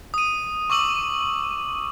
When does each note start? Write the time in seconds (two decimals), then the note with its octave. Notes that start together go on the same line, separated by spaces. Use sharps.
0.14 D#6 D#7
0.70 C#6 D6 E6 F#7